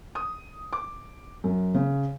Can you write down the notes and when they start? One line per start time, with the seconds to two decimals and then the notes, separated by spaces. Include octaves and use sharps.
0.15 D#6
0.73 D6
1.44 F#2
1.74 C#3